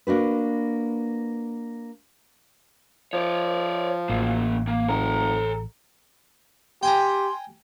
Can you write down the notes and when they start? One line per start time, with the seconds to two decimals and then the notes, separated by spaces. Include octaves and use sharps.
0.07 A#3 D4 F#4 B4
3.13 F3 C#5 D5
4.09 A1 F#3 A#3
4.67 A#3
4.88 F#1 A4 A#5
6.83 G4 G5 G#5 A#5 C6